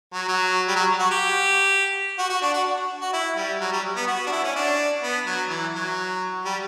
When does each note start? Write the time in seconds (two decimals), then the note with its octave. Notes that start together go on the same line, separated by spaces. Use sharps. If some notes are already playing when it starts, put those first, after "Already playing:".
0.13 F#3
0.28 F#3
0.68 G3
0.76 F#3
0.99 F#4
1.11 G4
2.18 F#4
2.30 F#4
2.42 D4
2.54 F#4
3.01 F#4
3.13 E4
3.36 G3
3.61 F#3
3.73 G3
3.96 B3
4.07 F#4
4.27 D4
4.32 E4
4.43 C#4
4.56 D4
5.03 B3
5.26 F#3
5.50 E3
5.74 F#3
6.45 G3